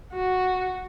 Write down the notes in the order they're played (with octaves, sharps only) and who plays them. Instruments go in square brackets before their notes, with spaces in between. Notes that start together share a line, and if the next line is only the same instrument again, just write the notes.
[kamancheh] F#4